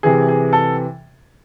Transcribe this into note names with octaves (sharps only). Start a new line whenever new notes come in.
C3 E3 G#4
G#4
A4